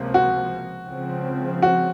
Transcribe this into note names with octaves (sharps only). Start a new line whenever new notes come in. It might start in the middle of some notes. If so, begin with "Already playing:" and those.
Already playing: C#2 C3 F3 A#3
F#4
C#2 C#3 F3 C4
F#4